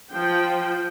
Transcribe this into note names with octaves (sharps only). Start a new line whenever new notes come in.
F3 G5